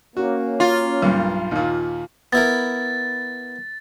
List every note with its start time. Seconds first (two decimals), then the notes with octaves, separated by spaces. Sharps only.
0.17 A#3 C#4 F#4
0.60 F4
1.02 B1 G2
1.51 D#2 A#2
2.33 B3 E4 A#4 A6